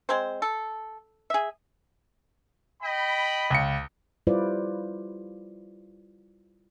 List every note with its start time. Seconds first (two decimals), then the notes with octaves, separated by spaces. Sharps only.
0.09 G#3 C4 C5
0.42 A4
1.30 G#4 E5
2.83 D#5 G5 B5
3.50 C#2 C#7
4.27 G3 E4 F4 B4 C5 D5